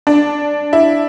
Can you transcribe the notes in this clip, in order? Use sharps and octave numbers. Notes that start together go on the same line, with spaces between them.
D4
E4